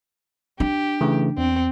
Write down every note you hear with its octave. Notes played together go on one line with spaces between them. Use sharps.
D4 G4
C#3 E3 A3
E2 C4